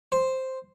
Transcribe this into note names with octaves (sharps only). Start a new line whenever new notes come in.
C5